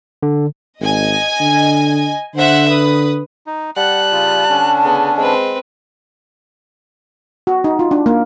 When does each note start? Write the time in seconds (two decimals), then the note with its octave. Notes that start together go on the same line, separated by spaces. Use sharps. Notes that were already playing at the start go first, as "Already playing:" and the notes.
0.23 D3
0.81 G#1 D#5 G#5
1.40 D3
2.35 D3 C5 E5 F#5
2.69 B4 D#6
3.47 D#4
3.77 G3 F#5 A5 F#6
4.12 C#3 F4
4.50 D3 C#4 D4
4.85 C#3 B3
5.17 G#3 C4 B4
7.47 F#4
7.64 D#4
7.79 F4
7.91 D4
8.06 A#3